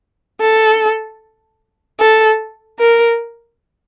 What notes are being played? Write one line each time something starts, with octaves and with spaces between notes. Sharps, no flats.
A4
A4
A#4